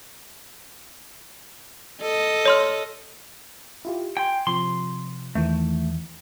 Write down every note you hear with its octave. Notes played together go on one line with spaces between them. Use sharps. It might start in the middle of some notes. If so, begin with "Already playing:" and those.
A4 D#5
C#5 C6 F6
E4 F4 G4
G5 G#5 C6
C3 F3 C6
E2 D#3 E3 A3